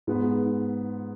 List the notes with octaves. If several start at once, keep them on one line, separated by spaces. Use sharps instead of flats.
G#2 G#3 B3